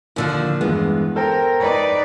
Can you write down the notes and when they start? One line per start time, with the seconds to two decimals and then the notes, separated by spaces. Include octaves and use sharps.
0.16 D#2 D3 F3
0.61 E2 G2 G#3 B3
1.16 A4 A#4 C5 G5
1.59 D#4 B4 D5